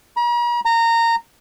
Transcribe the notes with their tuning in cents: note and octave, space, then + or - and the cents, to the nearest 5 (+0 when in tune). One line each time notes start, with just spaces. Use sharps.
A#5 +45
A#5 -20